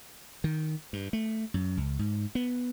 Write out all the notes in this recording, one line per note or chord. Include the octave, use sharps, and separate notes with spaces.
D#3
G2
A3
F#2
C#2
G#2
B3